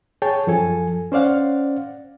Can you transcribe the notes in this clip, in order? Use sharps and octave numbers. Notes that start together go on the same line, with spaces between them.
G#4 C#5 G5 A5
F#2 F3 A4 G#5
C#4 C5 D5 F5 F#5